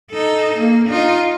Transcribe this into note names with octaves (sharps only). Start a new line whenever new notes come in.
D#4 A4
A#3
D#4 F4